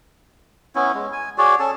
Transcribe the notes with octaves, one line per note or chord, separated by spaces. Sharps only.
B3 C#4 E4
G#3
G#5
F#4 G#4 C#5 D5
C#4 A4 A5